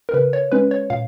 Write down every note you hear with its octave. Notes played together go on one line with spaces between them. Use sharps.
A#4
C#3 B4
C#5
G#3 C#4 B4
C#5
A#2 F5